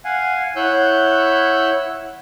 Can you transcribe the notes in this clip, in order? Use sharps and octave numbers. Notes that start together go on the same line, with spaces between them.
F5 F#5 G#5
E4 C#5 F#5 E6 F#6 G6